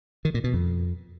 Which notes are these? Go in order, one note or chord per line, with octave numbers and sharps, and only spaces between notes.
D#3
A#2
B2
F2